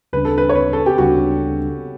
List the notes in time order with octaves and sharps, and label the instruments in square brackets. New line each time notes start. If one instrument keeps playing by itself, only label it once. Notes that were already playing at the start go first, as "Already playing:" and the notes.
[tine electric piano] D2 C#3 G3 D4 [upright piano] B4
[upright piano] A4
B4
C#5
B4
A4
G4
[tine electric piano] D2 C#3 G3 D4 [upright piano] F#4